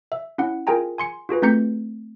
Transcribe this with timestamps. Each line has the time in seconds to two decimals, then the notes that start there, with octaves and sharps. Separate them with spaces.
0.12 E5
0.38 C#4 E4 F#5
0.67 F4 G#4 A#4 G5 G#5 A#5
0.98 G#5 C6 C#7
1.29 F4 F#4 G#4 B4
1.42 A3 C4 A#5 G6 B6 C#7